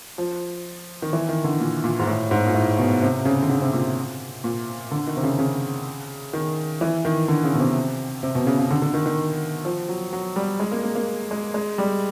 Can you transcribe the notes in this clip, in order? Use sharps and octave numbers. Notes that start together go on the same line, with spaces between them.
F3
D#3
E3
D#3
D3
A#2
A#2
G#2
A2
G#2
A#2
A2
B2
C3
C#3
D3
C#3
C3
A#2
A#2
D3
D#3
C3
C#3
C#3
D#3
E3
D#3
D3
C#3
B2
C3
C3
B2
C#3
C#3
D3
D3
D#3
D#3
F3
F#3
F#3
G3
G#3
A#3
A#3
A#3
G#3
G#3
G3